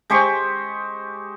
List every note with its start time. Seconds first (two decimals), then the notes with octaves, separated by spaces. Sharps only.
0.10 G#3 G4 C5 C#6